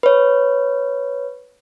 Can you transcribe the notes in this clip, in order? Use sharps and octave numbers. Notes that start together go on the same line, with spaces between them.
B4 C#5